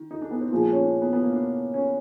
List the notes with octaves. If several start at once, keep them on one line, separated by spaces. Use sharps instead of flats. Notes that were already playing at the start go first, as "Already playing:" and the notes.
Already playing: D#3
D#4
D4
B3
C4
A#2 F3 G#3
C4
C#4
D4
B3
B3
A#3
D4
C#4